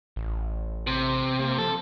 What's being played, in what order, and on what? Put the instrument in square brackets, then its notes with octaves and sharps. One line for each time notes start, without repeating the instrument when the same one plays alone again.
[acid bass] A1
[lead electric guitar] C3
[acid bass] A#3
[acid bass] F3 [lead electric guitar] A4